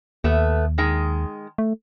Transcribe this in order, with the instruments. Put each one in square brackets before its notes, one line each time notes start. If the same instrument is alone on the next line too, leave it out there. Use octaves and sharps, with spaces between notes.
[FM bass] D#2 [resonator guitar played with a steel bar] A3 B3
[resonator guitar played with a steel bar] D#3 G#3
[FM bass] A3